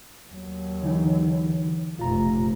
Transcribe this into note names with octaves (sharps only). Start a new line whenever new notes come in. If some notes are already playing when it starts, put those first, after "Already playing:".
D#2 F#3
D3 E3 D#4
F1 A#1 F4 A#5